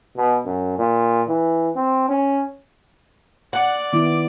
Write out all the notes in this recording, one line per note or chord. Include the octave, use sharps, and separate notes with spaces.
B2
F#2
A#2
E3
C4
C#4
D5 F#5
D#3 B3 E4 D6